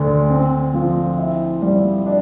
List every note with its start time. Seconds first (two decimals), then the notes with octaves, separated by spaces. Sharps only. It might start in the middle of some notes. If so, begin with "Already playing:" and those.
Already playing: D2 D3
0.30 C4
0.74 F3
1.18 E4
1.62 G3
2.06 D4